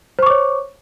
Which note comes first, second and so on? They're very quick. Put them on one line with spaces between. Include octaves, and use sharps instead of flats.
C5 C#6 D6 C#5